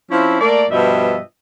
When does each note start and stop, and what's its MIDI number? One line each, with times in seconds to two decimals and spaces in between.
0.11 0.40 53
0.11 0.40 60
0.11 0.40 61
0.11 0.40 64
0.41 0.65 57
0.41 0.65 58
0.41 0.65 70
0.41 0.65 74
0.70 1.18 43
0.70 1.18 47
0.70 1.18 53
0.70 1.18 75
0.70 1.18 76